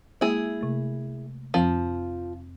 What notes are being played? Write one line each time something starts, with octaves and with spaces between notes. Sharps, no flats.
G#3 A#3 E4 G#4
C3 A3
F2 F3 C4